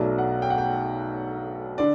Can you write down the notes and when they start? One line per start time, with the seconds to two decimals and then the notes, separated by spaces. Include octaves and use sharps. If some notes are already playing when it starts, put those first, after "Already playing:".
Already playing: B1 B2 F#3 A3 D5
0.18 F#5
0.42 G5
0.50 F#5
0.58 G5
1.78 D3 D5